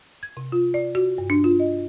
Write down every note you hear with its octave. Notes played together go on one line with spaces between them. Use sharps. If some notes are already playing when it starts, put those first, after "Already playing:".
G#6
C3
F4
D5
F#4
G2
D4
F4
D#5